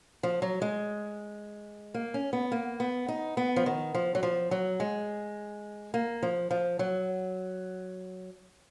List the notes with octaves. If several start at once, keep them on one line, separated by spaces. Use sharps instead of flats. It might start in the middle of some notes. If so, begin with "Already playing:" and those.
F3
F#3
G#3
A#3
C#4
B3
A#3
B3
D#4
B3
F3
D#3
F3
F#3
F3
F#3
G#3
A#3
F3
F3
F#3